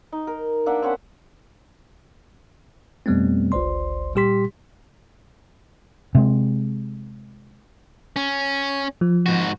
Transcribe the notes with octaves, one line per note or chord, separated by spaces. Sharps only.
D#4
A#4
A#3 D4 E5 F#5
C4 C#4 F#5 B5
F2 B2 G3 A3 B3 C4
G1 C#2 C5 D5 C6
A#2 G3 G4 C6 B6
C3 G#3
C#4
F3
G#2 F#4